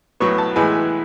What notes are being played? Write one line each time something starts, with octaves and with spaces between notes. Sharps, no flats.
A2 F#3 B3 C#6
A5
A2 E3 G#3 B3 G#5